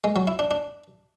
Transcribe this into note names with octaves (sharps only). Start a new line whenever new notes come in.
G#3
F#3
E4
D4
D4